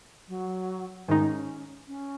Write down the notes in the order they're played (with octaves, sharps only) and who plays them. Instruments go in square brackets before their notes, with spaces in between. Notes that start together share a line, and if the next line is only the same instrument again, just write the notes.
[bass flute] F#3
[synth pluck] G#2 D#3 G#3 D#4 [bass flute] C#4
[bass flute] C#4